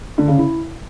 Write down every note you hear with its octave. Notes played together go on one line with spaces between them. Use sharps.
D3
C#3
E4